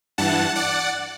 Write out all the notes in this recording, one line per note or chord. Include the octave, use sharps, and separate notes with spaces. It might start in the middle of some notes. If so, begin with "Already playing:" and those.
G2 E3 F#5 A5
D5 F#5